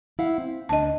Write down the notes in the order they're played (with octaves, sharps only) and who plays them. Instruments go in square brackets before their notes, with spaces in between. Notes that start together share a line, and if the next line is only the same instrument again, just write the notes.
[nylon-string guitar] E4 F5 F#5
C4
[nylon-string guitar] D2 D4 [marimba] D#5 A5